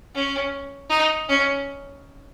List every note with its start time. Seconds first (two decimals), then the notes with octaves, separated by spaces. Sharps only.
0.14 C#4
0.90 D#4
1.29 C#4